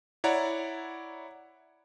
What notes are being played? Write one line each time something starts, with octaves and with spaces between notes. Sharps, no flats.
E4 C#5 D5 F#5 A#5